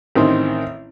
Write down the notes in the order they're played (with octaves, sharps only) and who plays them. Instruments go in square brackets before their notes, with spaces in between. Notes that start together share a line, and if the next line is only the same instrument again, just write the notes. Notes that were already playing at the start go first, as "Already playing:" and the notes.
[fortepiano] A1 D#3 C4